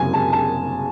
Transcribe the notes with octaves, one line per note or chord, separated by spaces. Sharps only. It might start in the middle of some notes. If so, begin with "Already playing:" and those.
Already playing: F#1 C3 G#3 G#5
A5
A5